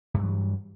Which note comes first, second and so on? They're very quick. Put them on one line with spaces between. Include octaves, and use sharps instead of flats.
G2 F#3 E3